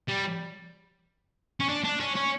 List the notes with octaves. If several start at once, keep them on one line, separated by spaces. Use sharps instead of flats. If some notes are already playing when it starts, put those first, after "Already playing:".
G3
C#4
D4
D4
C#4
C#4